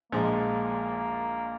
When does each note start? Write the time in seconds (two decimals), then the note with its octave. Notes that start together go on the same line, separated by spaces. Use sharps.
0.12 A#1 A#2 F3 G#3 A#3